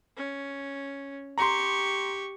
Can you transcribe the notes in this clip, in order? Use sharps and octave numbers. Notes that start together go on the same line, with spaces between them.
C#4
G4 A#5 C6 C#6